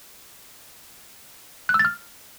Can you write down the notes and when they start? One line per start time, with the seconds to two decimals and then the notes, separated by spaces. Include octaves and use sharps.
1.69 F#6
1.74 E6
1.79 A6
1.85 F6